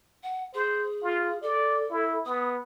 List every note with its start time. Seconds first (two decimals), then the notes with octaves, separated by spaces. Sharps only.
0.23 F#5
0.54 G#4 C5
1.03 F4
1.42 A4 D5
1.90 E4
2.26 B3 D#6